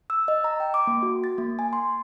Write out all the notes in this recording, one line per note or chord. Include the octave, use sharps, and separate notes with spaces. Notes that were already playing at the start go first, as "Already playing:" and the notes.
E6
D#5
A#5
G5
D6
A#3
F#4
A6
A#3
G#5
C6